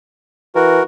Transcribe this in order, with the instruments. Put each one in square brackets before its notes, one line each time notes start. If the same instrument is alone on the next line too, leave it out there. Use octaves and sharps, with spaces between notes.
[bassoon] E3 [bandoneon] F#4 A#4